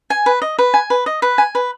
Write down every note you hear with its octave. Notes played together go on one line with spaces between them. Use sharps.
G#5
B4
D#5
B4
G#5
B4
D#5
B4
G#5
B4